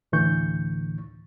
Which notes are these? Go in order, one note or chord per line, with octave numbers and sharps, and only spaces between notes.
D2 A2 D3 E3 C#6 G6